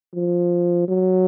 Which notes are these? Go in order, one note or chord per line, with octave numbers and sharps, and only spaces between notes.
F3
F#3